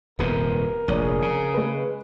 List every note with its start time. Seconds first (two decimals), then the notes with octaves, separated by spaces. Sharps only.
0.19 D#1 F2 C3 B3 A#4
0.88 F1 A#1 G#4 C#5 D5 D#7
1.22 C#3 A#5
1.54 G#3 B4